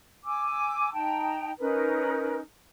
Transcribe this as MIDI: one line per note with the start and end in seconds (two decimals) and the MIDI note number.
0.24 0.92 80
0.24 0.92 86
0.24 0.92 88
0.92 1.51 63
0.92 1.51 79
0.92 1.51 81
0.92 1.51 82
1.59 2.39 61
1.59 2.39 63
1.59 2.39 70
1.59 2.39 71